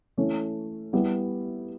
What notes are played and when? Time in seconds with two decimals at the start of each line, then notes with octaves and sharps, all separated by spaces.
0.18 E3 A3 C#4
0.93 G3 B3 E4 G4